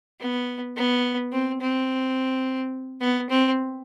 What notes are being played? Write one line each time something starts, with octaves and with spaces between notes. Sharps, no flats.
B3
B3
C4
C4
B3
C4